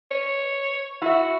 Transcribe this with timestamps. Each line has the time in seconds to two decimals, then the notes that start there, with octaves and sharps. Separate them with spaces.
0.11 C#5
1.02 E4 F#4 E5